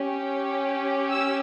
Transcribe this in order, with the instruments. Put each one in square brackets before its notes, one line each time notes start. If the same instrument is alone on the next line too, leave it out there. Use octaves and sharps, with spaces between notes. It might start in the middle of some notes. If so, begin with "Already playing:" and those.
Already playing: [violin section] C#4 G4
E6